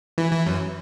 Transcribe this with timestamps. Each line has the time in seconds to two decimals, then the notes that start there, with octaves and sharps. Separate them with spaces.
0.18 E3
0.32 E3
0.46 F#2